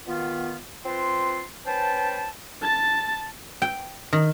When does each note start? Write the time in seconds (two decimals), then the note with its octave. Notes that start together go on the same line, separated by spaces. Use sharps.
0.07 B2 D#3 B3 F4
0.85 C4 F4 B4 C6
1.66 C#4 B4 C5 G5 A5
2.62 A5 A6
3.62 G5
4.13 D#3